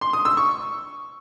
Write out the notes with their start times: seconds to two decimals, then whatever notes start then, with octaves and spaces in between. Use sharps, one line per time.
0.01 C6
0.13 D#6
0.25 E6
0.37 C#6